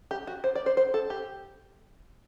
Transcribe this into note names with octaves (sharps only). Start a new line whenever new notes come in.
G4
F#4
C5
D5
C5
C5
A4
G4